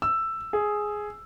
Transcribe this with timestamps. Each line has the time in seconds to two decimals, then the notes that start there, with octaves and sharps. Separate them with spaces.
0.02 E6
0.53 G#4